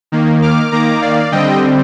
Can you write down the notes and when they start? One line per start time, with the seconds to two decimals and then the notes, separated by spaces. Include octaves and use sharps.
0.12 D#3 A#3
0.42 D6 F6
0.72 D#3 A#3 A#5 D6
1.01 D5 F5
1.32 D3 G3 C4 D#5 G5